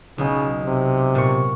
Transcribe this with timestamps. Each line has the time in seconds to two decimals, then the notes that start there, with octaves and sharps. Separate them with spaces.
0.18 B1 C#3
0.66 C3
1.15 A#2 C#6